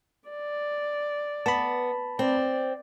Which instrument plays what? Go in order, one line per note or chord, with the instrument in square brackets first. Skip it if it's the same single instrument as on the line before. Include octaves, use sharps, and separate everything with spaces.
[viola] D5
[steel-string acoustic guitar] B3 [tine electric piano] A5 B5
[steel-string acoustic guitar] C4 [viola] D5